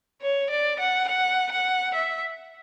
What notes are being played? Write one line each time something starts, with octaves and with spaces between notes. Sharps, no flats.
C#5
D5
F#5
F#5
F#5
E5